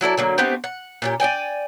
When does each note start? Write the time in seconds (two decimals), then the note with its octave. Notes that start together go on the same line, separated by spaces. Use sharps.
0.01 F#3 E4 A4 D5
0.17 D3 F#3 A#3
0.38 A3 B3 C4 G4
0.64 F#5
1.02 A#2 C#4 G4
1.20 D5 D#5 G5 G#5